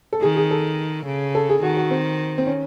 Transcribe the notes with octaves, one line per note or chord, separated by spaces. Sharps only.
A4
D#3 G#4
G#4
A4
C#3
A4
G#4
D#3 F#4
F#4
C4
C4
C#4